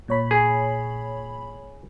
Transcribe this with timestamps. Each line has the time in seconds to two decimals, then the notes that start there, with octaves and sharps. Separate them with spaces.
0.08 A#2 C#5 B5
0.31 G#4